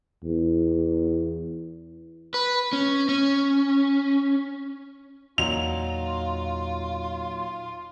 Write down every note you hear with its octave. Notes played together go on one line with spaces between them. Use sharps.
E2
B4
C#4
C#4
E2 A#2 F#3 D#4 F4 F7